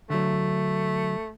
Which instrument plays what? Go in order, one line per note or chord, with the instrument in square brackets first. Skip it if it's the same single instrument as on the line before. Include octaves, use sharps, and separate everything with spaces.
[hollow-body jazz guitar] D3 F#3 [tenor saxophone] A3